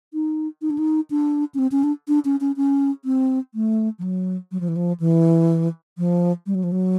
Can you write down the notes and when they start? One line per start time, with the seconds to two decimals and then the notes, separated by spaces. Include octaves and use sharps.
0.14 D#4
0.62 D#4
0.70 D4
0.78 D#4
1.10 D4
1.54 C#4
1.59 C4
1.72 C#4
1.83 D4
2.08 D4
2.25 C#4
2.40 C#4
2.57 C#4
3.05 C4
3.54 A3
3.99 F3
4.02 F#3
4.52 F#3
4.60 F3
4.68 E3
4.76 F3
5.00 E3
5.98 F3
6.46 G3
6.55 F#3
6.63 F3
6.72 F#3